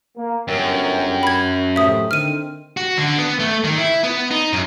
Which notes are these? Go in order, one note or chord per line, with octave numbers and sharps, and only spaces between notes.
A#3
G1 F#2 A#4 G5
B5 G#6
A2 C3 A3 E5 D#6
D3 D#3 C4 F6 D#7
F#4
D3
B3
A3
D#3
E4
B3
D#4
F#2